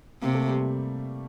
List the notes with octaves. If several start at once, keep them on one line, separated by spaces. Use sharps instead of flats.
C3 A#3
A3
G3